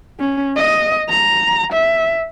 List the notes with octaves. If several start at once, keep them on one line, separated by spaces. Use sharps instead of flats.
C#4
D#5
A#5
E5